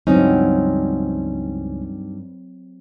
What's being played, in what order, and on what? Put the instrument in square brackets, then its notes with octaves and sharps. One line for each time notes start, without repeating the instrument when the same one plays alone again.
[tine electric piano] C#2 E3 C#4 [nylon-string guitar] G2 D#4 [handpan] F#3 C4